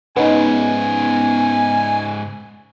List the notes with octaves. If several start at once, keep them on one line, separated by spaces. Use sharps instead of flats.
G#2 C#3 B3 C#4 D#4 G#5